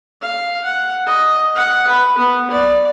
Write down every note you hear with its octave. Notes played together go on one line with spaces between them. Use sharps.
F5
F#5
D#5
F#5
B4
B3
D5